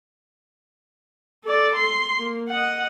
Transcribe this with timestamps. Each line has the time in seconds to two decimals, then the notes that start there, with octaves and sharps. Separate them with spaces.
1.45 A4 D5
1.76 C6
2.20 A#3
2.48 D#5 F#5